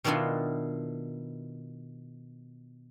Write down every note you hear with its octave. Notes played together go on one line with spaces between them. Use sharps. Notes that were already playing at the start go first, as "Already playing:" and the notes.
B2 D#3 B3 D4 E4 F4